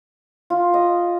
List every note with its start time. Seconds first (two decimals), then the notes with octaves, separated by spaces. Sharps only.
0.50 F4
0.74 D#5